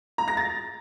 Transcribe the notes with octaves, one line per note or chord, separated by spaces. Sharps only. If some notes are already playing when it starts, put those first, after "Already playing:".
A#5
A#6
A6